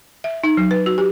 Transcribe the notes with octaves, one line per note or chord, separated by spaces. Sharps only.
E5
D#4
F#3
B4
F#4
G4